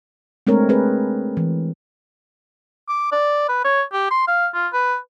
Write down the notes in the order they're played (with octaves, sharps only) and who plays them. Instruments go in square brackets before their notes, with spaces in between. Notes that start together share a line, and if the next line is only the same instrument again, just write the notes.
[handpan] G#3 A3 C4 D4 A#4 C#5
C4 G#4 B4
E3
[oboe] D6
D5
B4
C#5
G4
C6
F5
F4
B4